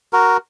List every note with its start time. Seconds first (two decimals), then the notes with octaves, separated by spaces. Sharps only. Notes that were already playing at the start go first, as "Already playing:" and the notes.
0.13 F#4 A#4